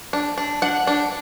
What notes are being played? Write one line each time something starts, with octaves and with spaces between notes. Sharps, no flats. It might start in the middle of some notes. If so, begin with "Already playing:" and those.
D4
D4
D4 F#5
D4